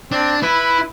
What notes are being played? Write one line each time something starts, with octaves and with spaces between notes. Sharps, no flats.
C4 D4
E4 B4